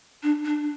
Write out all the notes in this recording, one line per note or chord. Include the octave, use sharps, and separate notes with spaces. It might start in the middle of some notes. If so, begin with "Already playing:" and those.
D4
D4